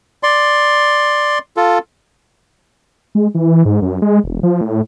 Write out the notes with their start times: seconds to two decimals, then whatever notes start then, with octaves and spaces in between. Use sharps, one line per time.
0.23 D5 C6
1.57 F4 A4
3.15 G#3
3.35 E3
3.65 G#2
3.82 F#2
4.02 G#3
4.24 E1
4.43 F3
4.61 A2